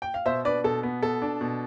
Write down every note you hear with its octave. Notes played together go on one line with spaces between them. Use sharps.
G5
F5
B2 C5 E5
D4 B4 D5
B2 A4
B3
B2 A4
D4
B2